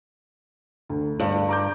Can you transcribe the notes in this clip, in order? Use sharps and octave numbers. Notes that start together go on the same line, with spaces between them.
D2
G2
A#5 D6 G6